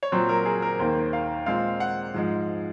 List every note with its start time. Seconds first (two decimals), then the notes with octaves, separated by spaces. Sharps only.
0.03 C#5
0.12 A#2 F#3 C4 C5
0.29 A#4
0.46 G#4
0.62 A#4
0.79 D#2 D#3 A#3 C5
1.13 F5
1.46 A#2 G#3 C4 F5
1.80 F#5
2.14 G#2 F3 G#3